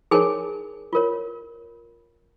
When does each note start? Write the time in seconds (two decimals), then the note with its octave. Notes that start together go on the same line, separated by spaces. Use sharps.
0.11 D#4 G#4 A#4 C#5 G#5
0.93 F4 A#4 C#5